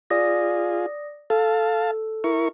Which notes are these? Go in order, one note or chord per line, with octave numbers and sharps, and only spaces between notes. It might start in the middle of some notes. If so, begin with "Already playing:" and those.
F4 G#4 D5 D#6 A#6
A4 F5 A5
E4 A#4 C#6